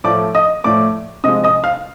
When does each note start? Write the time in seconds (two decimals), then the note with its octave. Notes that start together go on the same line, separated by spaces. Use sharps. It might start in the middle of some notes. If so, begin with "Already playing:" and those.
0.04 A2 F3 A3 D5 D6
0.35 D#5 D#6
0.64 A2 F3 A3 D5 D6
1.24 C3 F3 G#3 D#5 D#6
1.44 D#5 D#6
1.64 F5 F6